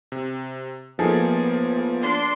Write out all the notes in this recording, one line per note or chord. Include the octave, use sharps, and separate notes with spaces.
C3
F3 A#3 B3 D#4 G#4 A4
D4 C6